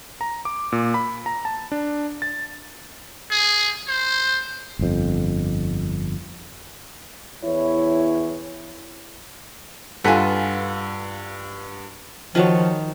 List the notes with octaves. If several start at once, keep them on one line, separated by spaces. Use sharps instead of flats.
A#5
D6
A#2
B5
A#5
A5
D4
A6
G#4
C5
G1 F2
E2 E3 E4 C#5
G2 F4 A4 B4 F#5 G#5 B6
D#3 F3 D#4 F4 F#4 C#5 A5